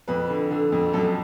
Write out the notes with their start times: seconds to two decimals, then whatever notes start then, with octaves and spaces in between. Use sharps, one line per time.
0.08 F2 B4
0.30 D3
0.51 D3
0.72 F2
0.93 F#2 A4